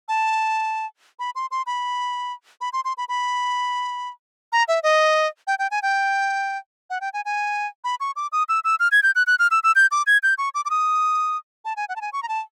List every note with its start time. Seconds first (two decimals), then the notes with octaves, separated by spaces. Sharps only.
0.08 A5
1.19 B5
1.35 C6
1.51 C6
1.66 B5
2.61 B5
2.73 C6
2.85 C6
2.98 B5
3.09 B5
4.52 A#5
4.68 E5
4.83 D#5
5.47 G5
5.59 G5
5.71 G#5
5.82 G5
6.90 F#5
7.01 G5
7.13 G#5
7.25 G#5
7.84 B5
8.00 C#6
8.16 D6
8.32 D#6
8.49 E6
8.64 E6
8.80 F6
8.92 G#6
9.03 G6
9.16 F#6
9.27 F#6
9.39 F6
9.51 E6
9.64 E6
9.76 G6
9.91 D6
10.07 G#6
10.23 G6
10.38 C#6
10.55 D6
10.65 D6
10.70 D#6
11.65 A5
11.77 G#5
11.89 F#5
11.96 A5
12.01 G#5
12.13 C#6
12.23 A#5
12.28 A5